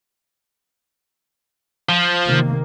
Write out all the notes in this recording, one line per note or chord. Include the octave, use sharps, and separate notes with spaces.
F3
C3 D#3 A#3